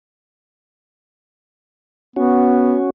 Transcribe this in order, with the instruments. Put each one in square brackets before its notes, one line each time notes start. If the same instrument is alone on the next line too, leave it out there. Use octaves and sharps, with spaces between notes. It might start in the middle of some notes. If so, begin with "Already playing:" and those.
[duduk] B3 [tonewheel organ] C#4 F#4